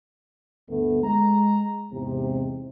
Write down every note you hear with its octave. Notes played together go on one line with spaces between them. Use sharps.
G1 D2 A3 B3
G#3 A#5
E2 G#2 C3